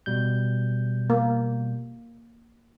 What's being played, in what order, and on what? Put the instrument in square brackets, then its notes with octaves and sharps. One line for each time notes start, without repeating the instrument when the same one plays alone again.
[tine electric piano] B2 G3 G6
[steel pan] A#3